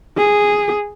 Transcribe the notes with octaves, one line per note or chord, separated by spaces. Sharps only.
G#4